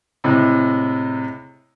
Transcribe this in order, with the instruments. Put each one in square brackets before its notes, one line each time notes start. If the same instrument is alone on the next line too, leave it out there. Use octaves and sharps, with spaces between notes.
[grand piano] A2 C3 G#3